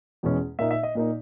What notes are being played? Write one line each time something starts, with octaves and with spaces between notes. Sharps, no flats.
E2 B2 G#3 C#4
A#2 A#3 D#4 E5
E5
D#5
A#2 A#3 D#4